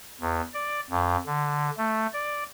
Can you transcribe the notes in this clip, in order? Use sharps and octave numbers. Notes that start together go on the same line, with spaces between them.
E2
D5
F2
D3
A3
D5